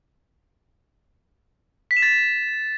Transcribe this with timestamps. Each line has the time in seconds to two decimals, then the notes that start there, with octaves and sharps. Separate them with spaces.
1.91 B6
1.97 E7
2.02 A6